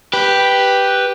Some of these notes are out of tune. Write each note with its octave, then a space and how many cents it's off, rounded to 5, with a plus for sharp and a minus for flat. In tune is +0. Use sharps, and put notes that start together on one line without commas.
G4 +0 B4 +0